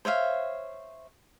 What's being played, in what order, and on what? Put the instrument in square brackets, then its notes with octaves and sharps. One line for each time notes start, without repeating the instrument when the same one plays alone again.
[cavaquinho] C5 C#5 E5 F5